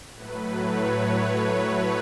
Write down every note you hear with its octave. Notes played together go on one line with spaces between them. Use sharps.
A2 F#3 A3 B4
C#5
B4